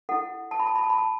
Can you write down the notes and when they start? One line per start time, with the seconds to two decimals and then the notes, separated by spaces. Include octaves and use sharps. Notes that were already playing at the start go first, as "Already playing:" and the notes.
0.09 E4 A4 F#5
0.51 A5
0.60 B5
0.67 A5
0.75 B5
0.83 A5
0.90 B5
0.98 A5